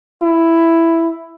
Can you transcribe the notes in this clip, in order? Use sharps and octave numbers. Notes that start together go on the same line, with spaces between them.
E4